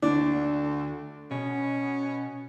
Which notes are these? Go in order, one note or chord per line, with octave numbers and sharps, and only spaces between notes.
D2 D3 D4
B2 C#4